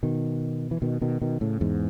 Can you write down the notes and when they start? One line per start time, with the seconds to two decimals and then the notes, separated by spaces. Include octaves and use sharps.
0.03 B2 D#3
0.71 E3
0.82 B2 D#3
1.01 B2 D#3
1.22 B2 D#3
1.41 A2 C#3
1.61 E2 G#2